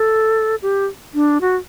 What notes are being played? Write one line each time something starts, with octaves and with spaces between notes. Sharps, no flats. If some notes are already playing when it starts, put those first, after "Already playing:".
Already playing: A4
G4
D4
F#4